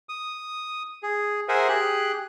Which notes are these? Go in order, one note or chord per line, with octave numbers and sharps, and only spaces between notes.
D#6
G#4
G#4 A#4 C5 E5 F#5 G#5
G4 G#4 F#6